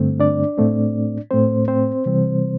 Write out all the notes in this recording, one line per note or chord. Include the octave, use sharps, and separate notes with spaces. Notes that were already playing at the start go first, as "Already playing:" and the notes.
Already playing: G2 D3 A3 C4
D4 D5
A2 A3 C4
A2 A3 C4 C5
C4 C5
C3 E3 G3 C4